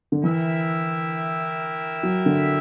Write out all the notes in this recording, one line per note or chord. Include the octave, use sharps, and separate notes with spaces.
D3
E3 E4 A#4 E5 G5
F#3
D3